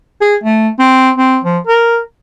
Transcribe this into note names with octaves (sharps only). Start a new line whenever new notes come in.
G#4
A3
C4
C4
F3
A#4